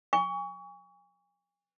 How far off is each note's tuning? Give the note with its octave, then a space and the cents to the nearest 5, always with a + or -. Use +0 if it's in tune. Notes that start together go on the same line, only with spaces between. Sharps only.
G#5 -35 C#6 +25